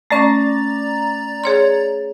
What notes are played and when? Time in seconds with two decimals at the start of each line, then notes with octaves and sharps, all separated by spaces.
0.11 A3 C#4 D5 A#5 A6
1.44 G#4 C#5 C6